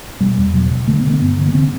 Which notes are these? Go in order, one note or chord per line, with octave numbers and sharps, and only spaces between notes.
B2 G3
E2
B2 F#3
B2
D3 A3
B3
D3
B3
G2 B3
D3
B3
D3 C4